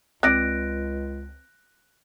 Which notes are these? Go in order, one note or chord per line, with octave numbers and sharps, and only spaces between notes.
C#2 C4 D5 F#6 A#6 D7